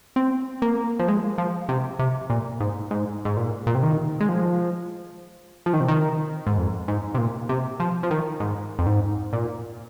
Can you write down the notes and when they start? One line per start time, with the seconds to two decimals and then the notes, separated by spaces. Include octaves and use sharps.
0.16 C4
0.62 A#3
0.99 F3
1.08 G#3
1.38 F3
1.69 C3
1.99 C3
2.30 A#2
2.60 G#2
2.91 G#2
3.25 G#2
3.37 A#2
3.67 A#2
3.75 C3
3.83 D#3
4.20 G#3
4.29 F3
5.66 F3
5.73 D#3
5.80 C3
5.88 D#3
6.47 G#2
6.58 F2
6.88 G#2
7.14 C3
7.18 A#2
7.49 C3
7.80 F3
8.03 F3
8.11 D#3
8.40 G#2
8.79 F2
8.86 G#2
9.33 A#2